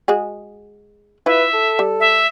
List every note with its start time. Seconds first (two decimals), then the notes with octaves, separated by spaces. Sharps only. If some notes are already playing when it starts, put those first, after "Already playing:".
0.08 G#3 F#4 G#4
1.26 E4 F4 B4 E5
1.53 A4
1.79 G3
1.99 E5